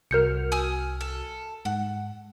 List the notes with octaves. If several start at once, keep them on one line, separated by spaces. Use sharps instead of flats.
C2 F#4 A#4 F6 G6 C#7
G#5 D#6 E6
A4
G#2 F#5